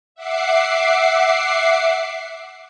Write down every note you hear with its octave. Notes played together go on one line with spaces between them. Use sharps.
E5 F#5 D6 C7